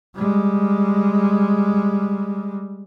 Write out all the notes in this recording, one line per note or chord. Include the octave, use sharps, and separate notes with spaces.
G3 G#3